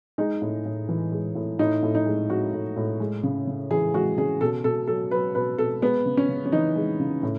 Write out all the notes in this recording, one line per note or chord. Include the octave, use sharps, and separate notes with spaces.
G#3 D#4
A2
A2
E3
G#3
A2
A2 D#4
A2
D#4
G#3
G#3 F#4
A2
A2
G#3
C#3
C#3
E3 G#4
G#3 F#4
C#3 G#4
B2 A4
B2 A4
F#3 A4
F#3 B4
B2 B4
B2 A4
G#3 B3
C#3
C#4
C#3
C#4
E3 D#4
G#3
C#3
A2